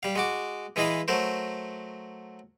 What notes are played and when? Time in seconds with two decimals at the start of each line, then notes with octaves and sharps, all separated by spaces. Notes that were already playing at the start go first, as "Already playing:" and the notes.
0.03 G3 F5
0.16 G#3 F#4 D6
0.76 E3 G#3 E4 D#5 F5 B5
1.08 F#3 A3 A#4 C5